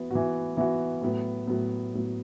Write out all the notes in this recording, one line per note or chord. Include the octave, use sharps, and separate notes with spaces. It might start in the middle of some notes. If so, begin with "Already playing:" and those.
Already playing: E3 B3 F#4
E3 B3 F#4
E3 B3 F#4
A2 F#3 B3
A2 F#3 B3
A2 F#3 B3